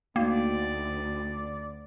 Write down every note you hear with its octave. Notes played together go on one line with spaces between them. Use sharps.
D2 A#3 D#4 F#4 D5 G5